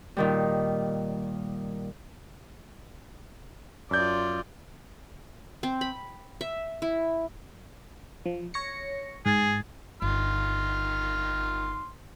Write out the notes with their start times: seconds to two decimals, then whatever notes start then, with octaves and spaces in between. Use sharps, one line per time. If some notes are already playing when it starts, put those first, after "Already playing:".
0.17 A#2 D#3 G3
3.91 F#2 F4 D5 G6
5.63 C4
5.81 B5
6.41 E5
6.82 E4
8.26 F3
8.54 C#5 A#6 C#7
9.26 G#2 G#4 G#6 A6
10.02 G1 D#3 C6 F6